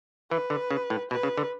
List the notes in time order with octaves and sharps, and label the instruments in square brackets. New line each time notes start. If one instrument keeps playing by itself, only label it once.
[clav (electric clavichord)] E3 [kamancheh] B4
[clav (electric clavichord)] D3
C#3
A2
[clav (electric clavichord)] B2 [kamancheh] B4
[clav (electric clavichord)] C#3
D3